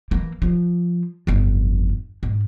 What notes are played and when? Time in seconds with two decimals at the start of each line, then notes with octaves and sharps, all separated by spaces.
0.11 E3 A#3
0.42 F3
1.27 G1 F2
2.23 G#2